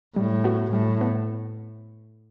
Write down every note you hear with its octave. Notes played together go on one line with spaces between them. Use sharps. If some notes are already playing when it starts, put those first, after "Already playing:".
A2 G3
B3 F#4
A2 G3
B3